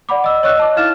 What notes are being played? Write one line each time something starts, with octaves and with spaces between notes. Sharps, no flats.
D5 F#5 B5 D6
D#5 E6
C#5 D#5 C#6 E6 F#6
D#5 A5 D6
D#4 E4 F5 F6 A6 E7